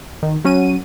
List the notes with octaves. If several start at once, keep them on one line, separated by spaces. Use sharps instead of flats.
D#3
F#3 C#4 F#4 D#7